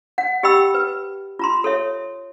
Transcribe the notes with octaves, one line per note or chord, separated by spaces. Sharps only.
F#5
G4 D#5 G5 B5 E6
B4
F4 A#5 C6
A4 C#5 E5